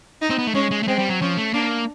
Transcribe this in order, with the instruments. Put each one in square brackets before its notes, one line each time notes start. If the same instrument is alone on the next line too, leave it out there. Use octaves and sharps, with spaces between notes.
[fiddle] D#4
[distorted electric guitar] C4
B3
A3
[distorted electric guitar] G#3 [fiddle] C#4
[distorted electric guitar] G#3
A3
[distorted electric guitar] G#3 [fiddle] C4
[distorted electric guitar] G3
F#3
[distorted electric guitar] F3 [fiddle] C#4
[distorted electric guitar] A3
[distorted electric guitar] A#3 [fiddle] D4